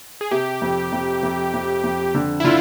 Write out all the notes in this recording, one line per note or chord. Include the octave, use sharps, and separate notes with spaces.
G#4
C3 G4
F2
F2
F2
F2
F2
D3
E4
D3 F4